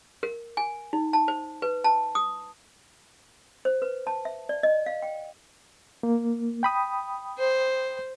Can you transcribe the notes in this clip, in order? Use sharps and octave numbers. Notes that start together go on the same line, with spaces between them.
A#4
G#5
D#4
A5
C5
B4
A5
D#6
C5
B4
A5
E5
D5
D#5
F5
G5
A#3
G5 B5 D#6
C5